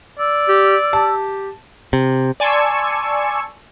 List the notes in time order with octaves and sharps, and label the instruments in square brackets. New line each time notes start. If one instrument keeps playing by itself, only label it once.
[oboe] D5 [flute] E6
[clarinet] G4
[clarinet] G4 [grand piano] A5
[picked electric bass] C3
[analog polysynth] D5 G#5 A5 C6 C#6 E6